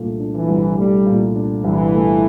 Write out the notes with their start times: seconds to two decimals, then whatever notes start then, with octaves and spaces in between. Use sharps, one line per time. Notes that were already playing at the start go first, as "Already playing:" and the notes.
Already playing: C2 A#2 A3 D4
0.20 D4
0.35 E3
0.49 C2
0.78 G3 A3
1.06 A#2
1.36 D4
1.64 C2 E3
1.93 A3